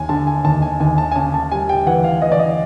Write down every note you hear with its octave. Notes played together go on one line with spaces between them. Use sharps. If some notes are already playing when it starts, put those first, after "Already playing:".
Already playing: D#2 G#5
D3 A5
G#5
D#2 A5
G#5
D#2 G#5
A5
G#5
C#3 A5
A5
G3 G#5
G5
E3 F#5
F5
E3 D#5
D5
D#5